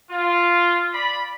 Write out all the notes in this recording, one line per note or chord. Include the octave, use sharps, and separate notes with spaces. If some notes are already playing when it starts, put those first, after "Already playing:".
F4
D5 B5